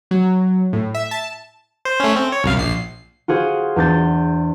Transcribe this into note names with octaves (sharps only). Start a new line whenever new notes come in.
F#3
A2
E5
A5
C5
A3 C#4
C4
C#5
C2 F#2 F5
A#1 C7
F4 F#4 G#4 C5
E2 D4 G6 A6